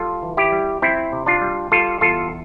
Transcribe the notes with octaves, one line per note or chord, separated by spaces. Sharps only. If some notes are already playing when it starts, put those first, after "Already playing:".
Already playing: G3 F4 A4
E3
E4 G4
G3
F2 C4 E4
C3
D4 F4
G3
G3 F4 A4
E2 F4 A4